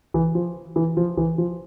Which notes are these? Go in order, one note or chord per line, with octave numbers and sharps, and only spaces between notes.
E3
F3
E3
F3
E3
F3